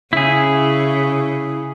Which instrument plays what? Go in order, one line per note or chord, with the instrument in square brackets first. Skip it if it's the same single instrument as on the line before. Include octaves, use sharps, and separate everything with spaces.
[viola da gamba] C#3 [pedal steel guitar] E4 G#4